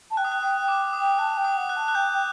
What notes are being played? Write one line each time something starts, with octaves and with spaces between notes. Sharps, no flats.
A5
G5 F#6
D#6
F#6
G5 D#6
G5
D6
D#6
G5
A5 F#6
G5
D#6
F#5
F#6
A5
F#6
G5 G6
G5